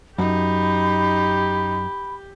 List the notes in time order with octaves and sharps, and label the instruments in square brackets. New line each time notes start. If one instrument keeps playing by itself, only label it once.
[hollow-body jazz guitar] F#2 [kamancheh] D#4 [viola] G4 [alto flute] B5